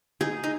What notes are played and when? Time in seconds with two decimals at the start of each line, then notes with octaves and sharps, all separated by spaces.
0.21 D#4 G#4
0.44 D#4